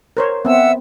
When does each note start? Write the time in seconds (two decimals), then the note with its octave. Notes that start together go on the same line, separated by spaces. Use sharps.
0.17 A#4 C5 C#5
0.45 B3 C4 E5 F#5 E6